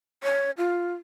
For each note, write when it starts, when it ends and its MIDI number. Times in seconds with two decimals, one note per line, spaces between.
0.23 0.51 73
0.58 0.92 65